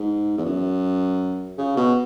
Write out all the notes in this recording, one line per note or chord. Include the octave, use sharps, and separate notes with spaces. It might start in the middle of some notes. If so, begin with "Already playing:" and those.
Already playing: G#2
E2
F#2
C#3
B2